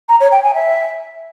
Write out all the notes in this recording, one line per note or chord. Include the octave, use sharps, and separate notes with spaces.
A#5
C#5
G5
G#5
E5